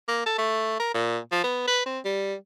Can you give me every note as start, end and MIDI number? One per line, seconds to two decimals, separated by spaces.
0.08 0.22 58
0.26 0.38 69
0.38 0.77 57
0.80 0.93 70
0.94 1.18 46
1.32 1.43 53
1.44 1.64 59
1.68 1.83 71
1.86 2.00 60
2.05 2.35 55